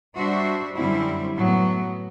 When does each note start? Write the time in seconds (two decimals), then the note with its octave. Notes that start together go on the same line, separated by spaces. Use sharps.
0.16 G3 D4 F#4 C5 E5
0.76 F#2 D3 G3 C4 E4
1.36 A2 F#3 B3